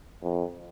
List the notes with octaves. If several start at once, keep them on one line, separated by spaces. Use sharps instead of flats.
F2